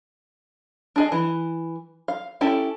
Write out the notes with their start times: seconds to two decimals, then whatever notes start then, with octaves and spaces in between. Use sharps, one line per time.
0.96 D4 G#4 D#5
1.12 E3
2.08 F5
2.41 C#4 E4 G4 A4